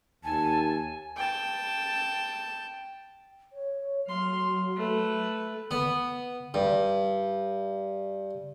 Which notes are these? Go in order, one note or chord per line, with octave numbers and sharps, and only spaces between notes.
D#2 G#5 A5
G5 A5
C#5
F#3 F5 C6
A3 B4
B3
G2